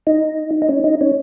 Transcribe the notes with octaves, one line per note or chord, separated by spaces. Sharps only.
D#4
D#4
C#4
D#4
C#4